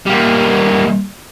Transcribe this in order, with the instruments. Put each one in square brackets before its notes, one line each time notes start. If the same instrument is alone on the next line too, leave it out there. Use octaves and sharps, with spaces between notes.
[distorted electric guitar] G3 A#3